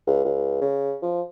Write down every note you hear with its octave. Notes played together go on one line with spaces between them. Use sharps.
C#2
C#2
C#3
F3